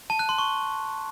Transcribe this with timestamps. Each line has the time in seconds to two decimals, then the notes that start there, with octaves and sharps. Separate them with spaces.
0.10 A5
0.19 F#6
0.29 C6
0.38 C#6